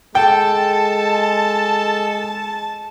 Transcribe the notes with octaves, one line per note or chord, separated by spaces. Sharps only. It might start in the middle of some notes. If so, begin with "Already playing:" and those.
G#3 A4 G5 A5